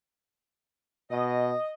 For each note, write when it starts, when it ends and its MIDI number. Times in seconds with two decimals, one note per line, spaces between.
1.11 1.54 47
1.11 1.74 75